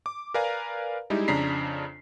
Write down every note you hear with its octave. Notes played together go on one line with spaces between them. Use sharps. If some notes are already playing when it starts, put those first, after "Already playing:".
D6
A#4 B4 D5 F5 G#5 A#5
G3 G#3 D#4 E4 G4
F2 C#3 D4 A#5 B6 C7